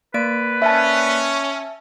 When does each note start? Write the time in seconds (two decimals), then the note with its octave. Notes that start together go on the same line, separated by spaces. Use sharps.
0.14 A#3 B4 D5 D7
0.62 C#4 E5 A5